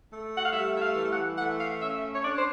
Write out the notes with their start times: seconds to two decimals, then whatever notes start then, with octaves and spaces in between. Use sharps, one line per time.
0.11 A3
0.37 F#5
0.44 F5
0.52 G3 E5
0.76 E5
0.81 F5
0.95 E3
1.10 F#5
1.38 A3 F#5
1.59 F5
1.81 C#4 E5
2.14 C#5
2.23 D4 D5
2.37 C5